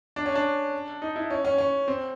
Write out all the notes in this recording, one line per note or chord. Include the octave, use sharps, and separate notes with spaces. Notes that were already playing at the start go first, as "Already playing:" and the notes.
D4
C#4
D4
D#4
E4
C#4
C#4
C#4
C4